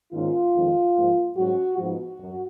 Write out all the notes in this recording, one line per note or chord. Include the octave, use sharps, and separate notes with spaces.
G#2 D#3 A#3 C#4 F4
F2 D#3 G#3
G#2 F3 A#3
G#2 F#3 C#4 F#4
G#2 F3 B3 D#4 F#4
F#2